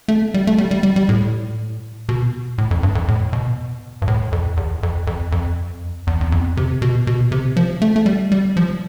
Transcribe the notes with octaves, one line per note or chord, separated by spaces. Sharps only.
A3
G3
A3
G3
G3
G3
G3
A2
B2
A2
F2
G2
F2
A2
B2
G2
A2
F2
E2
F2
F2
F2
E2
E2
F2
C3
B2
B2
C3
F3
A3
A3
G3
G3
F3